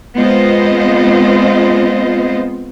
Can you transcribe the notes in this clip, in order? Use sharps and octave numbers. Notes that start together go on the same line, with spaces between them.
G#3 B3 C4 F4 C5 D#5